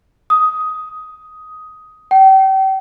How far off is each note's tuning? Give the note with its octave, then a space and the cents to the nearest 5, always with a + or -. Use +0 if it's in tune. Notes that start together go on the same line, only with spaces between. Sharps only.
D#6 +10
G5 -35